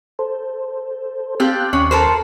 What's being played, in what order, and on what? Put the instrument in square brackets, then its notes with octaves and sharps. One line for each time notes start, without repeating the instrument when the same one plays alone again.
[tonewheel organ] A4 C5
[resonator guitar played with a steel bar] C4 G4 [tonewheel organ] F5 A5 F#6
[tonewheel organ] D#2 C6 F#6 [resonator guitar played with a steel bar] C#4
[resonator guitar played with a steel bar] A4 A#4 C5